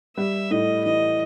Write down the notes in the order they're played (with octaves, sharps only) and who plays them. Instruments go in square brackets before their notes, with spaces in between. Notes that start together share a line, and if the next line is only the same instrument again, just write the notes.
[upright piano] G3 [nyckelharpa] E5
[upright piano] A2 [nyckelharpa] D#5
[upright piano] E3 [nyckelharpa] D#5